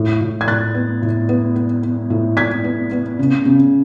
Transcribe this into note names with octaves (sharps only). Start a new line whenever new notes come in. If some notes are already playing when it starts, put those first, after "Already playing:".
Already playing: A2
A2
G#6
A2 F#6 A6
B3
A2
B3
B3
B3
A2
A2 G#6 B6
B3
B3
C#3
C#3